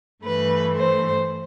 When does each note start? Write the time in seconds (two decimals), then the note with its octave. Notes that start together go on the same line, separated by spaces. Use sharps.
0.24 G2 E3 A3 B4
0.76 C5